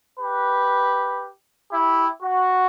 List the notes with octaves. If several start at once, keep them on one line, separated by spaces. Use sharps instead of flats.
G4 B4
E4 G4
F#4